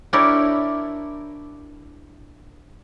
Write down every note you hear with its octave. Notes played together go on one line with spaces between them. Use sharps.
D4 E4 G4 A#4 C#5 D5